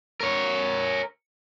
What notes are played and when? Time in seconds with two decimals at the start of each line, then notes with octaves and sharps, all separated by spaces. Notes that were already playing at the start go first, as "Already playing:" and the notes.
0.21 A#4 C#5